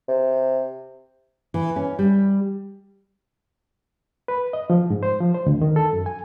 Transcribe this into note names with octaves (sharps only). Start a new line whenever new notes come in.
C3
E3
C#4
G3
B4
D#5
F3
G#2
C5
F3
C5
D2
D#3
A4
F#2
G#5